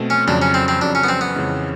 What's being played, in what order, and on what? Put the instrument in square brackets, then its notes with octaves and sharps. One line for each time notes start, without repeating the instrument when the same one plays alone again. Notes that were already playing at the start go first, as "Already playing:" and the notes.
Already playing: [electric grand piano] B2 A3 C4
[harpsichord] C#4
[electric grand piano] F2 C#3 F#3 [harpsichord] D4
[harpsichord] C#4
C4
C4
[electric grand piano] F2 C#3 F#3 [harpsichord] D4
[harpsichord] C#4
B3
C4
B3
[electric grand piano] F2 C#3 E3 G#3 C#4